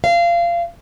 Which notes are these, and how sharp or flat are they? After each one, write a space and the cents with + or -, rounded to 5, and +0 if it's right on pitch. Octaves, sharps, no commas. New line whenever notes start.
F5 -25